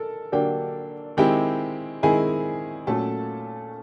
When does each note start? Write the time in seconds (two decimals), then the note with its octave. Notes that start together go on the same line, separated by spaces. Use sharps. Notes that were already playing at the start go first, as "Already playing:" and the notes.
Already playing: A4 A#4 A5
0.32 D3 F#3 A#3 D4 G4 G5
1.17 D#3 G#3 C4 E4 G4 G5
2.03 D#3 G#3 C4 E4 G#4 G#5
2.87 A#2 F#3 A3 C#4 A4 A5